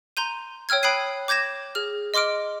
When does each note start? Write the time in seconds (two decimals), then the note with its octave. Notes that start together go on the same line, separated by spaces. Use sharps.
0.17 A#5 C6 G6 D#7
0.69 C#5 G5 E6 F6 G#6
0.83 G5 B5 D#6 F#6 C7 D#7
1.28 D6 G6 G#6 A#6 E7
1.75 G#4 F6
2.14 D#5 C6 D6 F6 D7